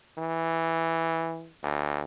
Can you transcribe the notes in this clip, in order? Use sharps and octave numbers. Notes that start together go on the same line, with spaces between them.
E3
D2